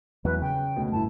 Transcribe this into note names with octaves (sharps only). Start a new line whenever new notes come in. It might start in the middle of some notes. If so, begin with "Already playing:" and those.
E2 F#3 B4
C#3 G5
D2 B2 A3
G1 A2 E4 A5